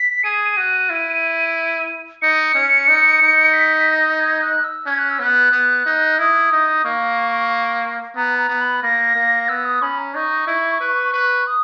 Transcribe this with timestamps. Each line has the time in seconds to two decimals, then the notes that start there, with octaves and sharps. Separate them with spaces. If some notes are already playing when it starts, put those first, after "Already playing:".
Already playing: B6
0.23 G#4 D#7
0.57 F#4
0.90 E4
2.22 D#4 C#7
2.55 C#4
2.88 D#4
3.22 D#4
3.54 B6
3.87 A#6
4.20 G#6
4.42 F#6
4.64 E6
4.86 C#4 G#6
4.98 F#6
5.10 E6
5.19 B3 F#6
5.52 B3
5.86 D#4
6.18 E4 D#6
6.52 D#4
6.84 A#3 C#6
8.16 B3 A#5
8.39 A#5
8.49 B3
8.61 B5
8.83 A#3 A#6
9.15 A#3
9.48 B3 E6
9.65 D#6
9.82 C#4 B5
9.98 A#5
10.14 D#4 C#6
10.47 E4
10.81 B4
11.14 B4
11.47 D#6